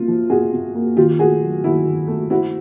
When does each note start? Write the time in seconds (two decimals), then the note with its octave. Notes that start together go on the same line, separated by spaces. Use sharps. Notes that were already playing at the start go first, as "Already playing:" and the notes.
Already playing: C3 A#3 F4
0.08 F3
0.30 C3 F#4 G#4
0.52 C3
0.75 A#3
0.97 D#3 F4 G4
1.19 A3 F#4 G#4
1.42 F#3
1.63 D#3 E4 F#4
1.87 D#3
2.08 A3
2.30 C4 E4 F#4